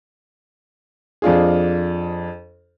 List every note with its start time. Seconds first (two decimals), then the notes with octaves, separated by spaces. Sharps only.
1.22 F2 D4 F4 G#4